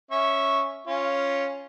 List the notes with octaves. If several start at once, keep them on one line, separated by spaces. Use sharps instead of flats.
C#4 E5 C#6
C#4 F4